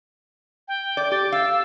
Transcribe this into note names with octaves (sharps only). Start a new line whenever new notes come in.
G5
D5
G4 A6
F5 E6